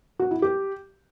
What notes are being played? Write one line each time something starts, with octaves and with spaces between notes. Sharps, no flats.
F#4
E4
G4